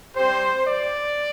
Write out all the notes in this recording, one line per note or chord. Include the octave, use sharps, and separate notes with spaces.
G3 C4 G4 C5
D5